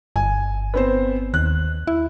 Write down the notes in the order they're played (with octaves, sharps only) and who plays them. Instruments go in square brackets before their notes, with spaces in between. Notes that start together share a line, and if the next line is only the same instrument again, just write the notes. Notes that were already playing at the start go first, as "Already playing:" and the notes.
[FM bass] G1 [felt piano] G#5
[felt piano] B3 C4 C5
[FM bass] D#2 [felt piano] F#6
[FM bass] E4